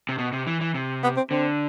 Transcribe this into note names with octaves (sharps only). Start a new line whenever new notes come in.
C3
B2
C3
E3
E3
C3
B3
C4
D3 C4